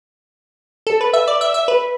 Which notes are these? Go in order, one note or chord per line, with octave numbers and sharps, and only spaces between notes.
A4
B4
E5
D5
E5
E5
B4